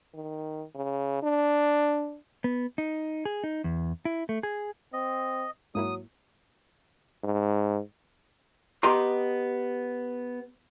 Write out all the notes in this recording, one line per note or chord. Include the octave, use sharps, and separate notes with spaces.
D#3
C#3
D4
B3
D#4
G#4
D#4
E2
E4
A3
G#4
C4 D#5
G#2 F#3 A#3 E4 D#6
G#2
B3 G4 D#5 A#5 C6